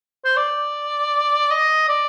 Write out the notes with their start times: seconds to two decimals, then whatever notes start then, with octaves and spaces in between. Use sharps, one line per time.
0.25 C5
0.36 D5
1.51 D#5
1.89 D5